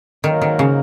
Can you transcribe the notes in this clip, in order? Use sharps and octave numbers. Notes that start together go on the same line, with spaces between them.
G#2 D#3 F#3 A#3 D#4 A#4
D#3
C#3